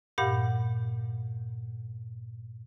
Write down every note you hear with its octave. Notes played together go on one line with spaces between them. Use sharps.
G2 A#2 G4 F5 F#5